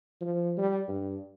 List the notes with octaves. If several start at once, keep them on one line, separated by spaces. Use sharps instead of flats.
F3
G3
G2